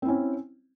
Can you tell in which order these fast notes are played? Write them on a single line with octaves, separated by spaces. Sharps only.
C4 E4 C#4